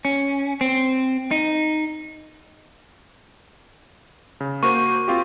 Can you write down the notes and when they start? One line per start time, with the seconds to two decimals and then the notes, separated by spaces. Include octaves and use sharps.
0.05 C#4
0.61 C4
1.31 D#4
4.41 C#3
4.63 A#3 F#4 C5 C#6
5.08 C4 F4 G4